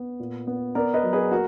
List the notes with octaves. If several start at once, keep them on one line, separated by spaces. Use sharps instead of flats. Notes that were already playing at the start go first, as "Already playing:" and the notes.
Already playing: B3
A#2
B3
B3 A#4 D5
B4 D#5
F#3
G#4 B4
A#3 F#4 A#4